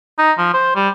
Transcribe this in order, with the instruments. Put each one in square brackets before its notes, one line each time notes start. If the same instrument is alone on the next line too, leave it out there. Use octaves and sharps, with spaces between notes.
[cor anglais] D#4
F3
C5
G3